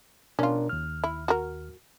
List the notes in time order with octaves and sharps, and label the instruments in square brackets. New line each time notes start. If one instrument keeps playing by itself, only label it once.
[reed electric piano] B2 D4 A#4 [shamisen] C#4 F4
[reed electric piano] D#2 F6
[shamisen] E4
F#4 A#4